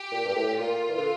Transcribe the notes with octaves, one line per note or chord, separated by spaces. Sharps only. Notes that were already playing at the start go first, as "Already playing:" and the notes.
Already playing: G4
A#2
G2
A2
A#2 F4
E3
D3